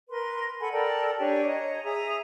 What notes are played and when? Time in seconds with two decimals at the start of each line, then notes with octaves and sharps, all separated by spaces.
0.09 A#4 B4 C6
0.60 A4 F#5 G#5 B5
0.72 A4 A#4 D5 G5
1.18 D4 G4 C#5 G#5
1.46 C#5 D#5 A#5
1.83 G#4 E5 A#5 D#6